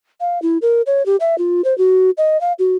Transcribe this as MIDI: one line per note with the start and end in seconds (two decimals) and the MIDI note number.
0.21 0.41 77
0.42 0.58 64
0.62 0.82 70
0.86 1.05 73
1.06 1.16 67
1.20 1.38 76
1.38 1.62 65
1.64 1.76 72
1.78 2.10 66
2.18 2.40 75
2.41 2.53 77
2.59 2.77 66